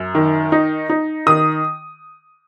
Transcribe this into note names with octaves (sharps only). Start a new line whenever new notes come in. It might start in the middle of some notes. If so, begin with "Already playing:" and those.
Already playing: F#2
D#3
D#4
D#4
D#3 D#6